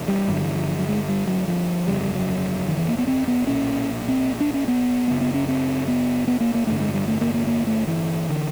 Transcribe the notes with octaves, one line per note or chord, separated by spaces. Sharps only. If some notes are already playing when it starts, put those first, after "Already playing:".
Already playing: E1 E2 C3
G3
G1 G2 D3 F#3
E3
F3
F3
F#3
G#3
G3
F#3
F3
G1 F2 C#3 G3
G3
F#3
D#3
E3
A#3
B3
C4
B3
B1 A#2 C#4
C4
D4
C#4
B3
F#1 F#2 C#3 B3
B3
C#4
C4
B3
B3
A#3
A#3
A1 G2 D3 A3
G#3
G3
A3
A#3
A#3
A#3
A3
E3
D3